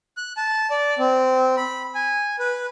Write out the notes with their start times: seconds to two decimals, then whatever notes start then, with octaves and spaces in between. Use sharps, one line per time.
0.17 F#6
0.37 A5
0.71 D5
0.99 C4
1.57 B5
1.95 G#5
2.39 B4